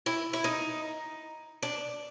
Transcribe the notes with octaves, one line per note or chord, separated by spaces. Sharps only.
E4
E4
D#4
D4